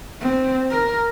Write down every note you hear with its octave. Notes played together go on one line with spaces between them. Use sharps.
C4
A#4